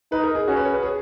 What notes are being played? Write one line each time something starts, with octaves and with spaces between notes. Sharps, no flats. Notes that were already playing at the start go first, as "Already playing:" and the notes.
D#4 B4
A#4
G#4
C#4 F#4
B4
C#5
B4
G#4